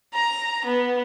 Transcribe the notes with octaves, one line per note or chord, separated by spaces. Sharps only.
A#5
B3